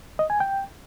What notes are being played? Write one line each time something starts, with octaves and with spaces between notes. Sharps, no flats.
D#5
G#5
G5